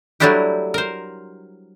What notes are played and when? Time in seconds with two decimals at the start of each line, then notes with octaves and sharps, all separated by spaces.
0.20 F#3 G3 A3 D4 E4 G4
0.74 A#4 C5